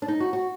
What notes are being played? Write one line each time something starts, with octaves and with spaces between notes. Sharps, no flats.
D4
D#4
F#4
F#4